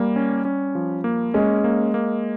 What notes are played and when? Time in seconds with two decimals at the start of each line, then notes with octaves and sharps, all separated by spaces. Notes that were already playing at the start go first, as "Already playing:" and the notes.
Already playing: G3 A#3
0.16 C#4
0.45 C#4
0.75 F3
1.04 A#3
1.34 G#3 C#4
1.64 A#3
1.94 A#3